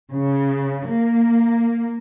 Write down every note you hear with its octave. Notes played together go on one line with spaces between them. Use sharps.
C#3
A#3